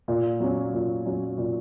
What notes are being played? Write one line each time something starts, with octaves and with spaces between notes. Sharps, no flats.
A#2
F#3 C#4
A#2
F#3 C#4
A#2